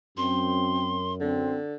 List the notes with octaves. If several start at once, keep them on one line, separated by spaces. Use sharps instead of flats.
F#2 C4 C6
D3 C4